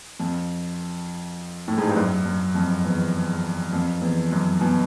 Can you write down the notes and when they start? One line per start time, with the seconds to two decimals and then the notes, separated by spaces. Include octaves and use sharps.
0.20 F2
1.68 A2
1.77 G#2
1.87 G2
1.96 F#2
2.26 F#2
2.55 F2
2.85 E2
3.73 F2
4.02 E2
4.32 F#2
4.61 B2